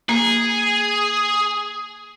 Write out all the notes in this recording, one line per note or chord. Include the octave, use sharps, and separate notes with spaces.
A#3 G#4